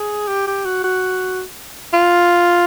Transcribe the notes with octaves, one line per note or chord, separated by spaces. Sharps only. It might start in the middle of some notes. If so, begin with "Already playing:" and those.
Already playing: G#4
G4
G4
F#4
F#4
F4